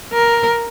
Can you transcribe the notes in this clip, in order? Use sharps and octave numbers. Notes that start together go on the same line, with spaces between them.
A#4